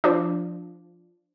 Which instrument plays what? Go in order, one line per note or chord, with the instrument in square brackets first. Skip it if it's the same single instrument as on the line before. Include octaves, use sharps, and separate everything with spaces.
[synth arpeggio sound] F3 D4